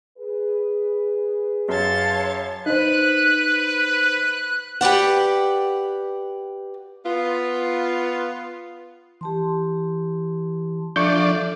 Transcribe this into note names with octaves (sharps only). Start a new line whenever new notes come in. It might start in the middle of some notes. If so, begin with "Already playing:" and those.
G#4 B4
F#2 C#5 F5 A5 C6 A6
D#4 B4 C5 F#6
G4 B4 D5 F#5
B3 F4
E3 G4 A5 C6
F3 D4 A4 D5 E5 C#6 G6